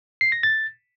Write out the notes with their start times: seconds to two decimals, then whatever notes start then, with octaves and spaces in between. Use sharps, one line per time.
0.21 C7
0.32 A#6
0.43 A6